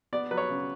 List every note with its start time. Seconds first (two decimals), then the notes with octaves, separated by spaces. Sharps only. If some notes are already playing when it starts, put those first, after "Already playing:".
0.13 B3 D5
0.31 F#3 B4
0.37 C#5
0.50 C#3